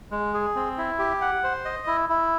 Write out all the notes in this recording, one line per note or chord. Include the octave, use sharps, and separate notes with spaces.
G#3
G#4
C4
E4
G4
F#5
C5
D#5
E4
E4